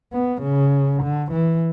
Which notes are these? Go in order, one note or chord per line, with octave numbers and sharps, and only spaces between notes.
B3
C#3
D3
E3